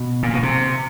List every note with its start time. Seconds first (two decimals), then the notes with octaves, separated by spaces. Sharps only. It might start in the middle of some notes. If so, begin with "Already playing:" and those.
Already playing: B2
0.23 A#2
0.33 B2
0.43 C3